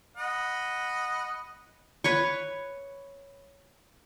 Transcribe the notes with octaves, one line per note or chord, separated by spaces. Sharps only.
D#5 F#5 B5
B4 C#5 C#6